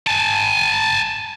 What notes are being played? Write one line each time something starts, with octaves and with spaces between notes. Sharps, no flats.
G#5 A5